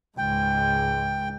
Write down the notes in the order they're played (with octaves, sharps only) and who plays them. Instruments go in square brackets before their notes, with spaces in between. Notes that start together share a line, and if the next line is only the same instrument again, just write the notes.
[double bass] C#2 G#2 [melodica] G5